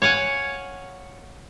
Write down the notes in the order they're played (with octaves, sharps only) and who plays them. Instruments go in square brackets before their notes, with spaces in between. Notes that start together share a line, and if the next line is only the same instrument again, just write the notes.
[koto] C#5 F5 F#5 G#5